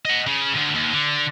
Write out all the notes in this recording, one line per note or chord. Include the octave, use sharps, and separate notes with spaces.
D#5 F#5
C#3
D2 G2
D#2
D3